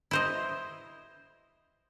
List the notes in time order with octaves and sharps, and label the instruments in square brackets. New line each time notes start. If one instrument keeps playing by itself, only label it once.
[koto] E4 C5 D#5